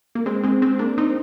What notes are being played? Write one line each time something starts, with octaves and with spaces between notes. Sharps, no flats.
A#3
G#3 C4
G#3 C4
G#3 C4
A#3 D4
C4 D#4